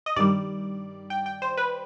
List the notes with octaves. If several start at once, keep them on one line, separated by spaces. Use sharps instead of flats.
D#5
G2 D#3 G3 D5
G5
G5
C5
B4